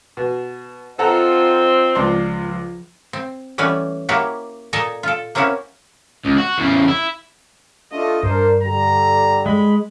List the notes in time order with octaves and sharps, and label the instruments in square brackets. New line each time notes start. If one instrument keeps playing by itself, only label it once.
[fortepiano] B2
[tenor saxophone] C4 [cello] D#4 F4 [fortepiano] A4 F#5 A#5
[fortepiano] C#2 D4 C6 [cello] F3
[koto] C4
E3 G3 A3 C#4 F#4 B4
A#3 E4 F#4 G4 C#5
A#2 A4 D#5 G#5 A#5
F4 A4
A#3 C4 C#4 E4 F#4
[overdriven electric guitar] C#2
F#4
E2 C#3
E4
[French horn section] A3 D4 F4 [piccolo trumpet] D#5
[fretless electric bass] G2 [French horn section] D4 A#4 [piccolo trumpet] C5
[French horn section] D3 G3 [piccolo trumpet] A#5
[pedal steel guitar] G#3 [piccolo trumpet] B5